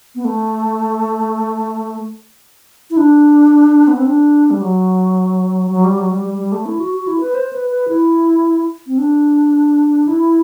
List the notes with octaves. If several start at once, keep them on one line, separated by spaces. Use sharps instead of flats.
B3
A3
E4
D4
B3
C4
D4
G3
F#3
F#3
G3
F#3
G3
G3
G3
A3
E4
F#4
F#4
E4
B4
C5
B4
B4
E4
C4
D4
E4